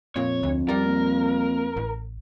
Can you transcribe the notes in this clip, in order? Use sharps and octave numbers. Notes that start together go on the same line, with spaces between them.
F2 A#2 C#5
D2
G3 A#4 A6
A#3
A1